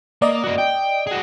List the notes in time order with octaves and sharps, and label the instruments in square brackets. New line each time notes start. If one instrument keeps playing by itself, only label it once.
[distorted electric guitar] A#3 [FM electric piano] D5 D#5
[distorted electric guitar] A#3 F#4
G5
F#4 G#4